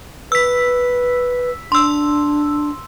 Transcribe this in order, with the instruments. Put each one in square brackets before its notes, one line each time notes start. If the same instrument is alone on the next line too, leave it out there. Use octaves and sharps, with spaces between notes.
[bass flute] B4 [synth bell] E6 B6
[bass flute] D4 [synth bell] C6 E6